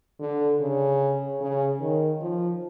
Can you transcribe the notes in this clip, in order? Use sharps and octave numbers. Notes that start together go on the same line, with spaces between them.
D3
C#3
C#3
D#3
F3